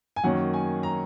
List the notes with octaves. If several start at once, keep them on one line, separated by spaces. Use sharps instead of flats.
G#5
F#2 D#3 F#3 A#3 C#4 F#5
G#5
A#5